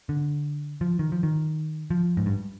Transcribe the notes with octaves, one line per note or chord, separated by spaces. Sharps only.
D3
F3
D#3
F3
D#3
F3
G#2
G2